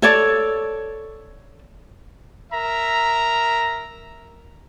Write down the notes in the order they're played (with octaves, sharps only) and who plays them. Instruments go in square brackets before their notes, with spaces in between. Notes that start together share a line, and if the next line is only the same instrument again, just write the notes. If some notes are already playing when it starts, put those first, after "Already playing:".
[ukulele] A4 C#5 D5
[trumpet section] A#4 E5 A#5